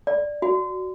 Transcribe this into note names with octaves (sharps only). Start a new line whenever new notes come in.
D5
F#4